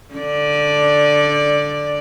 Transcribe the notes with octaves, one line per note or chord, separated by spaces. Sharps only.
D3 D5